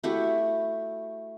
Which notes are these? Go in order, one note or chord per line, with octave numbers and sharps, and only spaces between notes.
A3 E4 F#4 G4